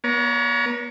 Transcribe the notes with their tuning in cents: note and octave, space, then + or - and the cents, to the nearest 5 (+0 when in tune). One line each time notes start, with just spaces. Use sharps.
B3 -40 C#5 +35 A#5 +0